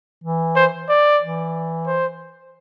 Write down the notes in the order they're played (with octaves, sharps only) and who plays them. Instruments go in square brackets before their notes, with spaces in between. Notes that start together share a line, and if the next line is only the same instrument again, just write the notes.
[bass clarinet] E3
[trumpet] C5
D5
[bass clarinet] E3
[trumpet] C5